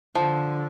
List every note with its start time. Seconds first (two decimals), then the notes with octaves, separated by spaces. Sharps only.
0.15 D3 F3